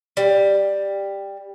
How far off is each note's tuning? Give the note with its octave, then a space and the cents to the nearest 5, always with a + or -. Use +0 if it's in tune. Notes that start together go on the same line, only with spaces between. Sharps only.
G3 +10